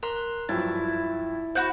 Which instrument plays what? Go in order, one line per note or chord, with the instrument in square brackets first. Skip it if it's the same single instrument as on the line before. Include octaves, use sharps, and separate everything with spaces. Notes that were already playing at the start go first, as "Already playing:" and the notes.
[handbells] A#4 A#5 C6 [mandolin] F#6
[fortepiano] G2 F3 F#3 [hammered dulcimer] E4 [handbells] A6
[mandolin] F#4 G6 [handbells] C5 F#5 B5